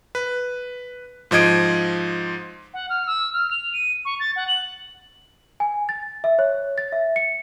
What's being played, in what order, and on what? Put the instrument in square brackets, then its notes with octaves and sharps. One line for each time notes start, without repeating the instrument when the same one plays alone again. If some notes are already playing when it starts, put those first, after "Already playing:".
[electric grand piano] B4
G#2 F3 D#5 G#6 D7
[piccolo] F#5
F6
E6
F6
F7
D#7
C#6
A6
F#5
F#7
[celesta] G#5
A6
E5
C#5
A6
E5
C#7